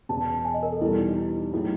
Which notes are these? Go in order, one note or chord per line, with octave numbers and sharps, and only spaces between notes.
E1 E2 B2 A5
G#5
D#5
A#4
A4
E2 B2 G3 E4
D#4
E4
D#4
A2 F#3 A#3 D#4 E4 G#4